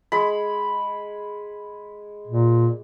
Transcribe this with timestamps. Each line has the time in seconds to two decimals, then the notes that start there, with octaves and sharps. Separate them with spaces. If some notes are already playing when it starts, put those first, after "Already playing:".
0.12 G#3 B5
2.27 A#2